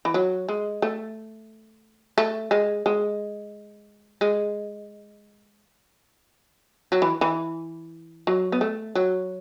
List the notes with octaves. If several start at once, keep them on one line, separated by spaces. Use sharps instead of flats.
E3
F#3
G#3
A3
A3
G#3
G#3
G#3
F#3
E3
E3
F#3
B3
A3
F#3